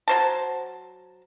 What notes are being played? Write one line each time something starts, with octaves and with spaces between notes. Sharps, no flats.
F#3 C5 A5